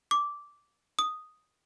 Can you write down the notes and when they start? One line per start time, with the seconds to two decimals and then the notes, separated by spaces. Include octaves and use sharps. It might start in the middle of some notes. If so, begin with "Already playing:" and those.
0.11 D6
0.99 D#6